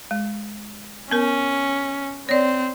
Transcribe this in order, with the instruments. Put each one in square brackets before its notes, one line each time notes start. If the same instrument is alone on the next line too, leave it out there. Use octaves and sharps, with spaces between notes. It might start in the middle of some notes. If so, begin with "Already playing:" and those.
[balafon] G#3
[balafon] B3 A#4 [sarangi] C#4
[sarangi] C4 [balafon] C#5 D5